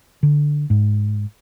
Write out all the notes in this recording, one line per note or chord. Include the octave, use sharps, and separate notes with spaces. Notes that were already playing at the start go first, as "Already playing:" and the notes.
D3
G#2